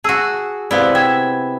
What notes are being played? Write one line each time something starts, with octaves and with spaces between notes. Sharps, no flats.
F#4 G#4 A5 E6
C3 B3 E4 D5 F5
E5 G5 E6 G#6